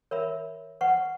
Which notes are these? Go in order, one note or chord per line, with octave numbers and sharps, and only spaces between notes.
A#4 C#5 E5 B5
B4 F#5 C#6